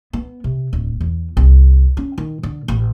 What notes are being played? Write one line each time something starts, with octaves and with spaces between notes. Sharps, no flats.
B3
C3
D1
E2
C2
C#4
D#3
D3
A1